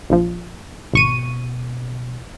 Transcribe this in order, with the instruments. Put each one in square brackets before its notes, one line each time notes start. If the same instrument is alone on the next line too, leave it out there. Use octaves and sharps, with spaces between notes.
[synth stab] A#1 F3
[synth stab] G#1 C#6 D#7 [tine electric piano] B2